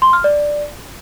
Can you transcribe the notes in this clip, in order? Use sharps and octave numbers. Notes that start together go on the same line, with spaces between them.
C6
F6
D5